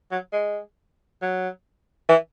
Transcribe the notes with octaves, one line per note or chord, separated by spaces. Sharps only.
F#3
G#3
F#3
E3